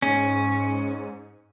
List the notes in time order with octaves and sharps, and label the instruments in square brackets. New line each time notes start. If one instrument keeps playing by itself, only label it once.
[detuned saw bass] G#2 [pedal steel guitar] C#4